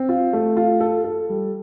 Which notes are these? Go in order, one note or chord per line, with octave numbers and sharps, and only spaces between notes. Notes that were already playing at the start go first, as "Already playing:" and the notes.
Already playing: C4
F4
A3
F4
A4
A4
G3